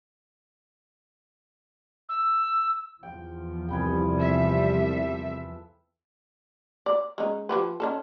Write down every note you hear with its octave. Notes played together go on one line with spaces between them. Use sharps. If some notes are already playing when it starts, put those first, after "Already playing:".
E6
E2 F3 G5
C2 G#4 B4 G5
G3 A4 E5
D5
G#3 C#4 D#4
F3 G4 B4
C#4 D#4 A4